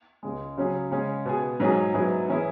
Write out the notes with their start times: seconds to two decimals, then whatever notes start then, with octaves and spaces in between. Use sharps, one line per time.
0.23 C#2 C#3 G#3
0.57 C#3 F#3 C#4 G#4
0.91 C#3 G#3 C#4 G#4
1.25 B2 B3 G#4
1.60 G#2 F#3 C#4 G#4
1.94 G#2 F#3 B3 E4 G#4
2.28 E3 C#4 E4 G#4